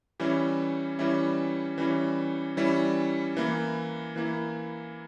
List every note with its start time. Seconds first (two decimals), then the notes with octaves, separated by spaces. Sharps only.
0.20 E3 G3 C#4 E4
0.99 E3 G3 C#4 E4
1.78 E3 G3 C#4 E4
2.57 E3 G3 C#4 E4
3.37 E3 A#3 E4
4.16 E3 A#3 E4